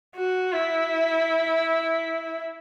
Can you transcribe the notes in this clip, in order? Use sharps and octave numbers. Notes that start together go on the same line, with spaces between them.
F#4
E4